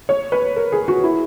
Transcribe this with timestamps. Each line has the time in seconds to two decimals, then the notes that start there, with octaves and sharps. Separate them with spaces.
0.09 C#5
0.32 B4
0.56 A#4
0.72 G#4
0.88 F#4
1.04 E4